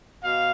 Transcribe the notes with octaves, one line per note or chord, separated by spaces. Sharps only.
B2 F5